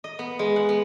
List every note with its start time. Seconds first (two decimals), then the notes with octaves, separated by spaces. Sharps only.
0.04 D#5
0.19 B3
0.39 G#3
0.56 F#5
0.69 B3